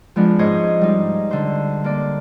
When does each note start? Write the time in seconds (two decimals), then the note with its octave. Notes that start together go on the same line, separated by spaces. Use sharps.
0.16 F3 G#3 B3 D4
0.39 G#2 C#4 C5 C#5 D#5
0.81 G3 D#4
1.31 D3 C5
1.84 A#3 D5